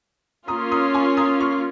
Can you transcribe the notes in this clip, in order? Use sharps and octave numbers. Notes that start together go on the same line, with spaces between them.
A#3 C#4 F4 A#5 D#6
A#5 D#6
G#5 C#6
A#5 D#6
C#6 F6